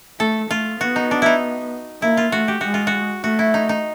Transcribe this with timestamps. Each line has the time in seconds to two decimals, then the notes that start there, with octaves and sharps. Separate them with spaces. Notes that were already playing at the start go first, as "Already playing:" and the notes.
0.20 A3 A4
0.50 A3 F4
0.81 B3 F#4
0.96 D#4
1.11 D4
1.22 D#4 E4
2.02 A#3 E4
2.17 F4
2.32 A3 F#4
2.48 G4
2.61 G#3 F#4
2.74 F4
2.87 F#4
3.24 A3 F#4
3.39 E4
3.54 D#4
3.69 D#4